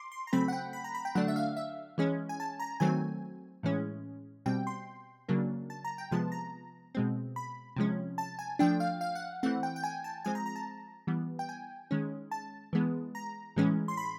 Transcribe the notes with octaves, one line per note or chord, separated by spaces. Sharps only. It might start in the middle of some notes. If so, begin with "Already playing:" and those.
Already playing: C6 D6
C6
A#5
C#3 F#3 A3 C4 B5
F#5
G5
B5
A#5
B5
G5
D3 F#3 A3 D4 F#5
E5
F5
E5
E3 G#3 C#4
G#5
A5
A#5
D#3 F#3 A3 C4 G#5
A2 E3 G#3 C#4
B2 G3 C4 G5
C6
C#3 F#3 A#3 D4
A5
A#5
G5
C3 F3 G#3 B3 A5
A#5
B2 G#3 C4
B5
C3 F3 G#3 C#4
A5
G#5
F3 A3 D4 G5
F5
F5
F#5
E3 A3 C4 F#5
G5
G5
G#5
A5
F3 G#3 C4 G#5
A#5
A#5
A5
E3 G3 B3
G5
G#5
D#3 G#3 C#4
A5
E3 G#3 B3
A#5
A2 E3 G#3 C#4
C6
B5